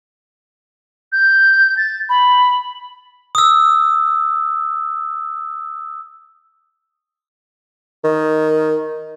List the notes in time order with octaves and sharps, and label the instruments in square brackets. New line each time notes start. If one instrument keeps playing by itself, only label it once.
[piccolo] G6
A6
B5
[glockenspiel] D#6 E6
[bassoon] D#3